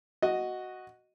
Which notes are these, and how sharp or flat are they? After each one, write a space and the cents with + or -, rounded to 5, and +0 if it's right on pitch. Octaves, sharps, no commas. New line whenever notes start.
F#4 +0 D#5 +0